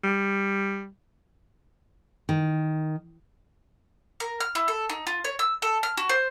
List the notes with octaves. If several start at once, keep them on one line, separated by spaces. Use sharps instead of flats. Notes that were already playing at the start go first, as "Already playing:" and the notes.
G3
D#3
A#4
F6
E4
A4
D#4
F4
C#5
E6
A4
F6
F#4
C5